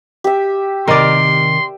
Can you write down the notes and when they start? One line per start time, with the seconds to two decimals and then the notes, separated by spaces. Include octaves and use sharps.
0.24 G4 E5
0.88 C3 D#3 A#4 D5 D#5 C6